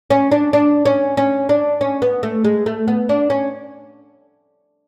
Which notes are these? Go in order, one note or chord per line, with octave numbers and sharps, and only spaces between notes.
C#4
D4
D4
C#4
C#4
D4
C#4
B3
A3
G#3
A3
B3
D4
C#4